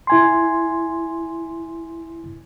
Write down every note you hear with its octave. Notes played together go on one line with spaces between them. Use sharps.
E4 G#5 C6